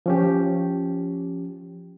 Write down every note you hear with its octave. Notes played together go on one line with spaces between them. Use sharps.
F3 C#4 G4